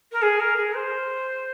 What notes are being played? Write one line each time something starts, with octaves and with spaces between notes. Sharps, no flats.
A#4
G#4
A#4
G#4
C5